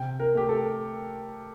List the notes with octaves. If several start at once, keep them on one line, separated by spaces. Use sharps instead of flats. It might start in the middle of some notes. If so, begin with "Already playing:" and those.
Already playing: C3 G5
A#4
A3 G4
A4